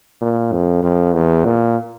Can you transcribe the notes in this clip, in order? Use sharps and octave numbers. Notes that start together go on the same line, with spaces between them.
A#2
F2
F2
E2
A#2